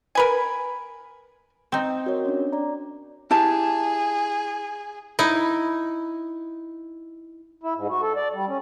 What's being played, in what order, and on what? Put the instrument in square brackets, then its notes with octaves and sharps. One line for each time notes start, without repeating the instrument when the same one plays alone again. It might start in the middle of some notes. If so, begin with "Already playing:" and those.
[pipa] A#4 B4 G#5
[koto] C4 D#4
[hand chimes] F#4 A#4 C#5
C#4 D4
D5 A#5
[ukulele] E4 G4 A5 [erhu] G#4
[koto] D#4 E4
[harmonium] E4
G#2
F#4
A4
D5
G3
C#4